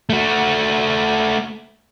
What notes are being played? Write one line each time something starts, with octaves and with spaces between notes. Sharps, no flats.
A3 F#4